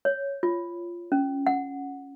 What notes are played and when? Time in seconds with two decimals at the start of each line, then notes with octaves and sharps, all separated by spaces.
0.05 C#5
0.43 F4
1.12 C#4
1.47 F#5